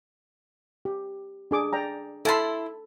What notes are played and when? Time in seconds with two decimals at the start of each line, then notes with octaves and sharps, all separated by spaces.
0.85 G4
1.51 D4 G#4 D6
1.73 D5 G5 A#5
2.25 E4 A4 A5 B5 C6